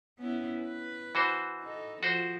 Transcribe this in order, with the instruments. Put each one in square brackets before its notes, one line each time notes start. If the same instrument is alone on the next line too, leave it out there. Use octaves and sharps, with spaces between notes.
[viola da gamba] B3 C#4 E4
B4
[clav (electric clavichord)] E3 F#4 C5
[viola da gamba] D#4 A4
[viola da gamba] F3 [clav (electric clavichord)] F#4 C5